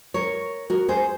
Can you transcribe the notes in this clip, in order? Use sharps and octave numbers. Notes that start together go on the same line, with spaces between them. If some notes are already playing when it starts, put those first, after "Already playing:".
A#4 C#5
F#4 A#4
G#4 C5